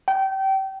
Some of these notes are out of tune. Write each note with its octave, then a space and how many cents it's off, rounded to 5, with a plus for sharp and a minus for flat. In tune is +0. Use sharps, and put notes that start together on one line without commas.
G5 -25